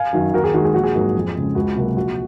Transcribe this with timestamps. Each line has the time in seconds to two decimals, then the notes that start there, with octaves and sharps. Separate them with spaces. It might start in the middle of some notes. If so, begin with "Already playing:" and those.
Already playing: F5 G#5
0.13 F#2 D#3 F#3
0.33 D#2 F#4 A#4
0.44 G#4
0.54 D#3 G#3 F#4
0.65 G#4
0.74 A#1 F#4
0.83 G#4
0.95 G#2 F#3 A#3
1.15 F2
1.36 C#3 G#3
1.55 C#2 F#4
1.76 C3 F#3 A#3
1.97 A#1 F#4